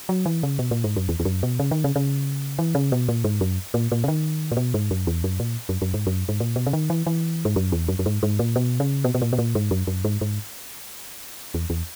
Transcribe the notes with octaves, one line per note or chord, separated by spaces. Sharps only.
F#3
E3
C#3
B2
A#2
G#2
F#2
E2
E2
F#2
B2
C#3
D#3
C#3
C#3
E3
C#3
B2
A#2
G#2
F#2
A#2
A#2
C#3
D#3
A#2
B2
G#2
F#2
E2
F#2
A#2
F#2
F#2
G#2
F#2
G#2
A#2
B2
C#3
D#3
E3
E3
G#2
F#2
E2
F#2
F#2
G#2
G#2
A#2
B2
C#3
B2
B2
A#2
B2
A#2
G#2
F#2
F#2
G#2
G#2
E2
E2